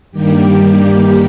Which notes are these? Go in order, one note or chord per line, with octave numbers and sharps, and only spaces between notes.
G2 D#3 G3 A#3 G4